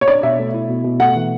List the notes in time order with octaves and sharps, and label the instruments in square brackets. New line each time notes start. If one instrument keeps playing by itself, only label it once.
[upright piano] C#5
[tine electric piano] D4 [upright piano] D5
[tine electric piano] B2 [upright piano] E5
[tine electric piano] A3
E4
B2
B2
[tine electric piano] A3 [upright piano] F#5
[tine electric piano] E3